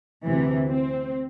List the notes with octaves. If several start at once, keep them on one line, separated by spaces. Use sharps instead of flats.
D2 C3 E3
C4